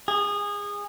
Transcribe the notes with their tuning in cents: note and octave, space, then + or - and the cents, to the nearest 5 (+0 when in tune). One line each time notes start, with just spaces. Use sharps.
G#4 -25